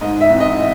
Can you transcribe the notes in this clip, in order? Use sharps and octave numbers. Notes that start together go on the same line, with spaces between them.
G#2 D#5
E5
E3 C4
D#5